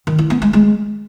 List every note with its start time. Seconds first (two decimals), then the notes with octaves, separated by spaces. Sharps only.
0.07 D#3
0.19 E4
0.30 B3
0.42 G#3
0.53 G#3